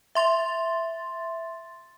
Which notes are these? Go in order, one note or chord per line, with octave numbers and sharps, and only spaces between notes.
E5 C6 A6